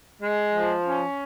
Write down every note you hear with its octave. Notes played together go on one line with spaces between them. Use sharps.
G#3
F3
C#4